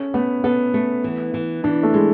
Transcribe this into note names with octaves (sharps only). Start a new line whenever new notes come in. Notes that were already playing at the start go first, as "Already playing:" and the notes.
Already playing: C#4 A4
A3 B3
B3 A4
A3
E3
E3
E3 D4
A3
G#3